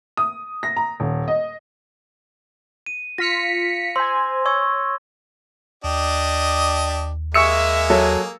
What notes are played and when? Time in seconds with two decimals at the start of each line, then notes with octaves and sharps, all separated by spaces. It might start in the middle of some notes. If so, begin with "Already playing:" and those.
0.17 D#6
0.63 A#6
0.77 A#5
1.00 D#1
1.28 D#5
2.86 D#7
3.18 F4 A#6 B6 C#7 F7
3.96 C5 G#5 C6 E6
4.46 C#5 C#6 E6 G#6
5.84 D#2 D4 G4 D#5
7.34 G#3 A#3 G#4 E5 C#6 E6 C#7
7.90 F#3 A4